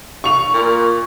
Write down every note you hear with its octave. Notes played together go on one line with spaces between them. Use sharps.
C#6 F7
A#2